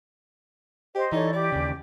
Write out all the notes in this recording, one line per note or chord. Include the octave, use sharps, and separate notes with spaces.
G4 C5 D#5
E3 D#4 A4 C#5 D5
G4 D5
D#2 C#3